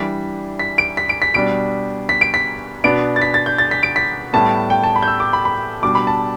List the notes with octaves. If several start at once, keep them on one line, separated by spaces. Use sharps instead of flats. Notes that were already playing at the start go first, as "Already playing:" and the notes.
Already playing: E3 G3 D4 B6
B6
D7
B6
D7
B6
B2 G3 D4 D7
B6
D7
B6
B2 B3 D4 D7
A6
B6
A6
G6
A6
B6
D7
B6
A2 G3 B3 A5
G5
A5
B5
G6
E6
D6
B5
B5
B2 G3 D4 D6
B5
A5